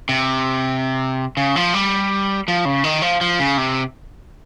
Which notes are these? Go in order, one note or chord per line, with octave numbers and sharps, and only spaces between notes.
C3
C#3
F3
G3
F3
C#3
D#3
F3
F3
C#3
C3